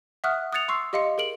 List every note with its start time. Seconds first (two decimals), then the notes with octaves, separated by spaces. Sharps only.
0.24 E5 F#5 C#6 D#6 F6 F#6
0.53 D#6 F#6 G#6 A6 C#7 F7
0.68 C6 C#6 E6 C7
0.93 G4 D#5 F5 C6 C#7
1.18 G#4 A#4 D7 F#7